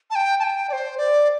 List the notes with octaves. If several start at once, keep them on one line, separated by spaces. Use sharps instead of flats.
A5
G5
A5
G5
D5
C5
D5